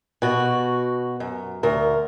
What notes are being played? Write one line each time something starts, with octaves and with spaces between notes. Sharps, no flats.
B2 F#4
F#2
D2 A#4